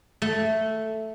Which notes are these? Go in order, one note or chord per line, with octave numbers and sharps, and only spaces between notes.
A3